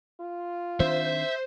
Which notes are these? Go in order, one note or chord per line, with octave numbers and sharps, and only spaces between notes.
F4
D#3 C4 D4 C5 E5